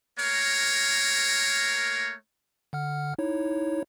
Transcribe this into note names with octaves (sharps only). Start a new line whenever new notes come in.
A3 A#3 A#4 C#5
D3 F#5 F6
D#4 E4 C#5